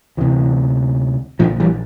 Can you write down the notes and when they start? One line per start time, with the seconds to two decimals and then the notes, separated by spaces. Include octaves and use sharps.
0.17 D2 C3 E3
1.39 A#1 A#2 D3 F3
1.60 E3 G3